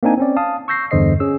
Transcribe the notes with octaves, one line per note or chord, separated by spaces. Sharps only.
A#3 C4 D4 D#4 G#5
C4 C#4 D5
F5 A5 D#6
C#6 E6 G6 A#6 C7
E2 G2 D3 C5 D#5 C7
C#4 G#4 E6